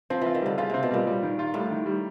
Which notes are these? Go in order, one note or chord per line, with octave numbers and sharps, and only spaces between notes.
F3 C4
E3 F4
D#3
D3 G3
C#3 F4
C3 C4
B2
A#2 G3
G3
D#3
F4
A2 G3
D#3
G3